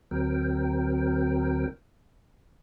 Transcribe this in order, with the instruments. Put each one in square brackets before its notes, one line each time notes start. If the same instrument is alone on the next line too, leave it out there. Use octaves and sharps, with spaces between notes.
[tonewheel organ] D2 F#3 C4 A#4 G5